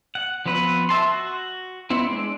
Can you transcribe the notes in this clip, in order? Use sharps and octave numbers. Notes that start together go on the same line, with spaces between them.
F#5
F3 B3 C4 B4 F#5
E5 A5 C6
F#4
B3 C4 E4
G#3 C4 D4